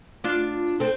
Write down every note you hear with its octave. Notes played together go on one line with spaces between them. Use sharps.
D4 F4
A3 C4